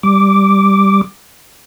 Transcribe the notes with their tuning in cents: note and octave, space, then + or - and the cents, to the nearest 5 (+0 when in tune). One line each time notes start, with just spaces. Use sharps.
G3 +0 D6 +0